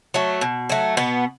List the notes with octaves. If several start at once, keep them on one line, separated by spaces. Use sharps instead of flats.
F#3 A3
B2
F#3 A3
B2 B3